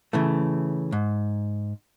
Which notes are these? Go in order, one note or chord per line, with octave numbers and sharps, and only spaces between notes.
C#3 E3 A3
G#2